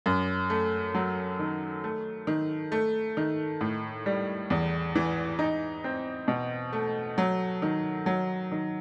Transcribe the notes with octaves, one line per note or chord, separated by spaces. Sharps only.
F#2
A3
F#3
D#3
A3
D#3
A3
D#3
A2
G3
E2
E3
D#4
C4
B2
A3
F#3
D#3
F#3
D#3